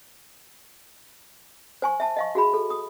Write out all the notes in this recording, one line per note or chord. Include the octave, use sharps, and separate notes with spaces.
C5 G#5 C#6
E5 A5
D#5 F5 C#6
F#4 G#4 B5
A4
D#6